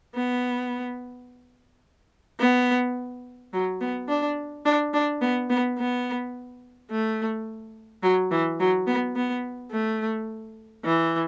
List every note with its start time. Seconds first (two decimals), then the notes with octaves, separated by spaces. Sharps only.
0.15 B3
2.40 B3
3.53 F#3
3.81 B3
4.09 D4
4.65 D4
4.94 D4
5.21 B3
5.50 B3
5.79 B3
6.91 A3
8.03 F#3
8.31 E3
8.60 F#3
8.87 B3
9.16 B3
9.72 A3
10.84 E3